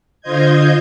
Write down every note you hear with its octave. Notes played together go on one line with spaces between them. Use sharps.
D3 F4 C5 D#5 G6 G#6